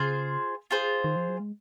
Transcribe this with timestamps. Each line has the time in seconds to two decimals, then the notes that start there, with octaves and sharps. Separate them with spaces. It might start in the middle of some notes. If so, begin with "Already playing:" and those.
Already playing: C#3 F4 G#4 C5
0.71 F4 G#4 C5
1.04 D#3
1.16 F3
1.28 F#3
1.40 G#3